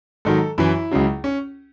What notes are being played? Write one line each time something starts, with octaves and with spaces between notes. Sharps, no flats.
G#2 D#3 F#3 A4
F#2 E3 E4
C#2 C#3 F#3
C#4